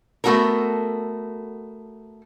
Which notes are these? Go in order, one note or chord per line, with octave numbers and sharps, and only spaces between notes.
A3 B3 F#4 A4 A#4